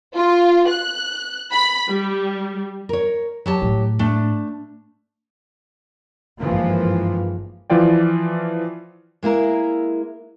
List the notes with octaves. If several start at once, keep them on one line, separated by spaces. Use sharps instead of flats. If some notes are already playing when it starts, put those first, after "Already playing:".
F4
F#6
B5
G3
A#4 C#5
F#3 G4 A5
A2
A3 D4
G#1 G2 E3 F3 A#3
E3 F3 F4 D5 G5
G#3 A#3 E4 A#4